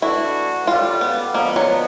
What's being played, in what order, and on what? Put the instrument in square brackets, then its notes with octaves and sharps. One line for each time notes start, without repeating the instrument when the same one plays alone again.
[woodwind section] E3 A3 D4 F#4 [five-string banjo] E4
[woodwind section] F#2 D3 G3 [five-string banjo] F4
[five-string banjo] B3
[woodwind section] D3 F3 G#3 B3 [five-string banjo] A#3
[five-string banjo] F#3